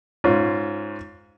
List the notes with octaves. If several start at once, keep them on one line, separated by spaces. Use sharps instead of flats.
G#2 C#4 F4